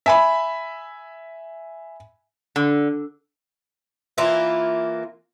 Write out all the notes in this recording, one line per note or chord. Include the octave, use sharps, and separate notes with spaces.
E5 G#5 B5
D3
E3 A#3 E4 F4